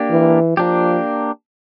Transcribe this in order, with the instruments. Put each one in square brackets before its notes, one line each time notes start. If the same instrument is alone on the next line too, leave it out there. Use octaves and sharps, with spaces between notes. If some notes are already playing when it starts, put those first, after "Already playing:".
Already playing: [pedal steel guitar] A#3 D4 G4
[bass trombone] E3
[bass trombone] F3 [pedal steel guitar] A#3 D4 G4